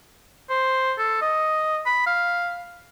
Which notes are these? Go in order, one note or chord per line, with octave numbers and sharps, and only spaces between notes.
C5
A4
D#5
B5
F5